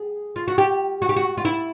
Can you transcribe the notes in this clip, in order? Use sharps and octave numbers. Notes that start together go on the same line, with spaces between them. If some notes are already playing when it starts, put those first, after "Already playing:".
Already playing: G#4
F4
F#4
G4
F#4
G4
F#4
F4
E4